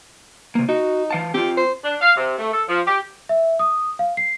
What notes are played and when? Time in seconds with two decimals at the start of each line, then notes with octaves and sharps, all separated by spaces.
0.55 C3 A#3
0.69 D#4 F#4
1.11 E3 F5 A5
1.34 C4 F4 G4
1.57 C5
1.84 D4
2.01 F5
2.17 C3
2.38 A3
2.52 A4
2.67 F3
2.86 G4
3.29 E5
3.59 D#6
3.99 F5
4.17 C7